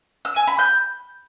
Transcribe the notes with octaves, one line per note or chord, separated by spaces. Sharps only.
E6
G#5
B5
G6